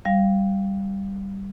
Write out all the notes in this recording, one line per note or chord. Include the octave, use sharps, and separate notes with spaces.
G3 F5